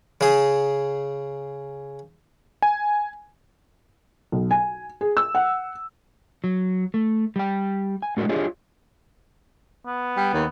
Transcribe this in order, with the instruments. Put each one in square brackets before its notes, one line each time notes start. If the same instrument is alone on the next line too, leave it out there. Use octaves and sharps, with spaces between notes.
[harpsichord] C#3 G#4
[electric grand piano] G#5
[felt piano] B1
G#5
G#4
E6
F#5
[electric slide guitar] F#3
A3
G3 G5
G#5
A2 G#3 D4 F#4 A#4
D4 F4 G4 G#4 C#5 D#5
[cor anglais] B3
[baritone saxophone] G3
D#2